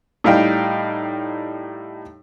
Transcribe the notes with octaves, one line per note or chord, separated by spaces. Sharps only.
A2 G3 D#4 F5 G5